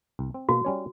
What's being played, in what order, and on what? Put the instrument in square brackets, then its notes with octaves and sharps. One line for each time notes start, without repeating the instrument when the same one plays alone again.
[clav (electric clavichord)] C2
C4
[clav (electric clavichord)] B2 A#3 [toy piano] F#4
[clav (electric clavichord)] G3 C#4 C#5